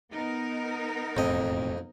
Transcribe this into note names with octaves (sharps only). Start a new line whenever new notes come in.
B3 D#4 A#4
E1 F2 A2 C4 D#5